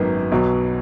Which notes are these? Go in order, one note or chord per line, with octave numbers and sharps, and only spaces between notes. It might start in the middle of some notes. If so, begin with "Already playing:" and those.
Already playing: G#1 F#2 D#3 F#3 A#3 B3
B1 B2 F#3